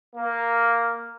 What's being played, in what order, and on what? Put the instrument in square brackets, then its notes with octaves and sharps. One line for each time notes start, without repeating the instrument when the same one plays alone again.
[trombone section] A#3